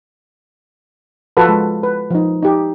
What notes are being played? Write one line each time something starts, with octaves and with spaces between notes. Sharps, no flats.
F3 F4 F#4 A4 B4
G#3
B4
F3 D#4
D#4 G4